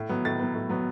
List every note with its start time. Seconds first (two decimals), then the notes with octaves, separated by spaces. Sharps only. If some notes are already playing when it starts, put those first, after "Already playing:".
Already playing: A2
0.09 F#3 B3
0.25 A2 A6
0.39 F#3 B3
0.55 A2
0.70 F#3 B3